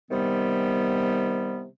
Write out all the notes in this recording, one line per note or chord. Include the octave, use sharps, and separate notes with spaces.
C3 D#3 G3 B3